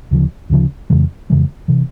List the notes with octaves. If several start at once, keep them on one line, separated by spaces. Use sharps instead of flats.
D2 C#3 F3
D2 C#3 F3
F2 C#3 E3 G#3
F2 C#3 E3 G#3
C3 E3